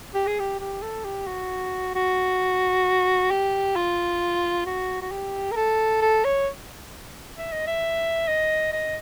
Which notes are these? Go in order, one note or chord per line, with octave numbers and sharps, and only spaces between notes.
G4
G#4
G4
G4
A4
G4
F#4
F#4
G4
F4
F#4
F#4
G4
A#4
A4
A4
C#5
E5
D#5
E5
D#5
D#5